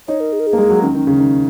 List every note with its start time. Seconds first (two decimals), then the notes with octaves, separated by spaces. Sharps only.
0.08 D#4 C#5
0.20 A#4
0.33 G#4
0.40 A#4
0.47 G#4
0.53 A#3
0.58 G#3
0.70 F#3
0.82 D#3 C#4
0.95 D#3
1.07 C#3
1.19 D#3